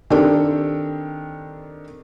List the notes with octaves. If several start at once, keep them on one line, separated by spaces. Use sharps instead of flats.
D#3 C4 D4 G4 A4